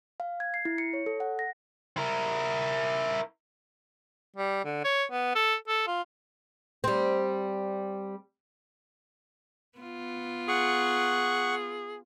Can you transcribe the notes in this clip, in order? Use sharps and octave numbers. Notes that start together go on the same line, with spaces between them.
F5
G#6
C7
E4
C#7
C#5
A4
F#5
A#6
E4 A#4
G3
D3
C#5
B3
A4
A4
F4
G3 C4
B3 F4
G#4 F#5 C#6